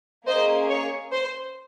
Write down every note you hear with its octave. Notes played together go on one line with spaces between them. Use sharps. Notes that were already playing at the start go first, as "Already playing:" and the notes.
A#3 C#4 G#4 C5 D#5
C#5
C5